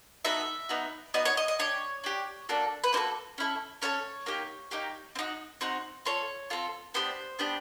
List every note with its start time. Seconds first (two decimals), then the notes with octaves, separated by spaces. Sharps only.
0.25 B3 D#4 F#4 A4 E5
0.69 B3 D#4 F#4
1.14 B3 D#4 F#4 D#5
1.25 C#5
1.37 D#5
1.48 D#5
1.59 D4 G4 C#5
2.04 D4 G4
2.49 A#3 D4 F#4 A4
2.84 B4
2.93 A#3 D4 F#4 A4 C5
3.38 C#4 E4 A4
3.82 C#4 E4 A4 C#5
4.26 A#3 D#4 G4
4.71 A#3 D#4 G4
5.16 C4
5.19 D#4 F#4
5.61 C4 D#4 F#4
6.05 C4 F4 A4 C#5
6.50 C4 F4 A4
6.94 B3 D4 G4 C5
7.39 B3 D4 G4